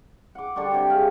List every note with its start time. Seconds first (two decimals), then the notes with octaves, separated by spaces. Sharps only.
0.35 F#5 D6
0.56 D3 G3 D4 C#6
0.71 C3 C#5
0.90 G#4 F5